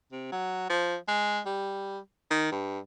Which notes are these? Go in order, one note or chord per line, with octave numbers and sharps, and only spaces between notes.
C3
F#3
F3
G#3
G3
D#3
G2